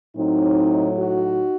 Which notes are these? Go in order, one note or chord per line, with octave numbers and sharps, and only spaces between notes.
A2 F#3 C4 D#4
D#4 F#4